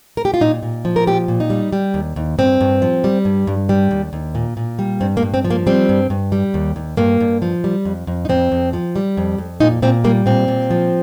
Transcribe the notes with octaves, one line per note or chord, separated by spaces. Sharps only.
A#4
G4
F4
A#2 D#4
A#2
F3
A#4
A#2 G4
A#2
D#4
G3
G3
D#2
D#2
G2 C4
G2
F3
G3
G2
G2
G3
D#2
D#2
A#2
A#2
G3
G2 C4
A#3
G2
C4
F3
A#3
G3 C4
G2
G2
G3
D#2
D#2
G2 A#3
G2
F3
G3
F2
F2
D#4
F2 C4
F2
F3
G3
F2
F2
A#2 D#4
A#2 C4
G3 A#3
A#2 C4
A#2
F3